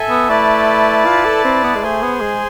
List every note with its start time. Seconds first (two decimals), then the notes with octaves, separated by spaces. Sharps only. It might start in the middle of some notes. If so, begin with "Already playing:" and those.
Already playing: A4 E5 G#5
0.10 B3
0.29 A3 E4 B4 D5 A5
1.06 F4
1.25 A4
1.45 C4
1.63 B3
1.75 G#3
1.83 A3 G#4 C5 G#5
2.02 B3
2.21 G#3